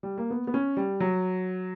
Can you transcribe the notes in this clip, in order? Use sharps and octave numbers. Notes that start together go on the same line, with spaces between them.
G3
A#3
B3
B3
C#4
G3
F#3